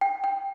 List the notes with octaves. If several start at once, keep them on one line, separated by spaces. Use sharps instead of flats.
G5
G5